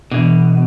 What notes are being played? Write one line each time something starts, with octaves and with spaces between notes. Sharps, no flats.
B2 E3 B3 D4